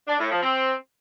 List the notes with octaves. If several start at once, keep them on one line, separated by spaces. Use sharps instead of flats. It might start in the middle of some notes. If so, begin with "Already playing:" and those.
D4
A2
F3
C4